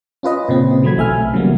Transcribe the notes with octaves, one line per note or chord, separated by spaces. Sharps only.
C#4 F4 B4 D#5
A#2 C#3 C4
E3 F#3 A3 B5 G#6
B1 A3 E5 G#5 F6
C#3 E3 F#3 G3 A#3 B3